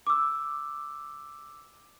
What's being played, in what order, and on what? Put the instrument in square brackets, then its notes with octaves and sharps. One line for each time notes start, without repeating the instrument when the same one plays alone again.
[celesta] D6 E6